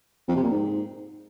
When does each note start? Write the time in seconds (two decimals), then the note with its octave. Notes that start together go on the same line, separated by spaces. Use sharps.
0.28 F2
0.36 C3
0.43 A#2
0.51 G#2